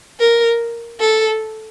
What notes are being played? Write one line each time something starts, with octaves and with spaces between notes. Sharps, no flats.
A#4
A4